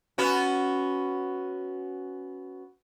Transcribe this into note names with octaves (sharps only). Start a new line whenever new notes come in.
B3 C#4 F#4